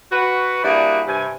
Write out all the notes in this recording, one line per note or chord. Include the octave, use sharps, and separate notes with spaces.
F#4 B4
G3 A#3 D4 E4 F#4 G#4
G2 C3 G#5